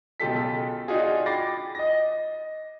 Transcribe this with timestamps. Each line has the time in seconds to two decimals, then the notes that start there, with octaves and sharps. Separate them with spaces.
0.20 B1 C#3 F4 G4 A4 B6
0.88 D4 D#4 F4 F#4 G#4
1.26 G5 B5 D6 A6 A#6 C7
1.75 D#5 A#6